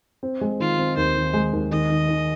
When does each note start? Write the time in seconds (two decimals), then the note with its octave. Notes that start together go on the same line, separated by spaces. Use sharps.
0.23 C4
0.41 G#3
0.60 D#3 F4
0.79 C4
0.97 D#2 C5
1.16 D#3
1.33 G#3
1.53 D#2
1.71 D#3 D#5
1.90 D#3
2.09 D#3